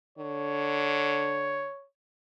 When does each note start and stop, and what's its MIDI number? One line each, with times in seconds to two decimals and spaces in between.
0.18 1.69 50
0.18 1.86 73